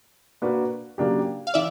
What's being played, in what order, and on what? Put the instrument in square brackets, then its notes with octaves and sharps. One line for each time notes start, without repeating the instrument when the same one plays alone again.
[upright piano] A#3 D4 F#4 B4
C#3 F#3 A#3 D4 G4
[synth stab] F5
[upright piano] E3 [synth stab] D5 E5